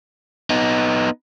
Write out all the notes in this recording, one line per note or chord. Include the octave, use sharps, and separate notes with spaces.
B3 D#4